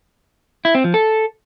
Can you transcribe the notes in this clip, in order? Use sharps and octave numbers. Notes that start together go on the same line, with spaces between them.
E4
C4
F3
A4